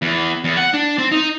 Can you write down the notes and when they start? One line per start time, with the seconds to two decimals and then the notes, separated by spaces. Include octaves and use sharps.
0.02 E2
0.44 E2
0.57 F#5
0.74 D4
0.98 C4
1.12 D#4